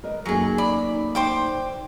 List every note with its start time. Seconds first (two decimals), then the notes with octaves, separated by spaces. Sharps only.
0.04 A#4 B4 D#5
0.25 F#2 F#3 A3 A#3 D#4 G#4
0.58 D5 B5
1.15 C5 G5 D6